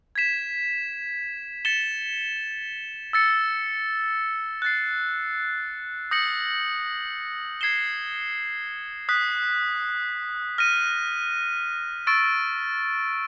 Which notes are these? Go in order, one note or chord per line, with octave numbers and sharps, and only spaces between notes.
G#6 B6 E7
A6 C#7 E7 G7
E6 A6 C#7
F#6 A6 C7
D#6 G6 A#6 C#7 F#7
G#6 C7 E7 G7
D#6 F#6 B6
F6 A#6 D#7
C#6 E6 A6 D7